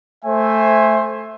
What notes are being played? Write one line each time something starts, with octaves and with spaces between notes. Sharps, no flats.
A3 C5 E5 G#5